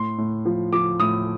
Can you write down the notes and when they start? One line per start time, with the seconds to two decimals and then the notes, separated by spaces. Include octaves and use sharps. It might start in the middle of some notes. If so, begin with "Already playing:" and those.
Already playing: A2 C6
0.18 A2
0.45 F3
0.72 F3 D6
1.00 A2 D#6